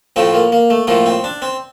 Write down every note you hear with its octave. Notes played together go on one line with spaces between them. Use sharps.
A2 F3 A3 C4
A#3
A#3
A3
A2 F3 A3 A#3
C4
D4
C4